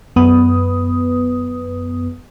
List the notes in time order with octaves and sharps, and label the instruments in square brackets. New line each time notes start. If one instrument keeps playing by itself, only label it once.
[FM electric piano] F#2 B3 B4 D#6